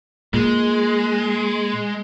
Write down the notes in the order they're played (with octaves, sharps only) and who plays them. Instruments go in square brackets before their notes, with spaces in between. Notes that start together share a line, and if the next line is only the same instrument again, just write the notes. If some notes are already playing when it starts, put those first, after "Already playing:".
[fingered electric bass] A#2 [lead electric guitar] G#3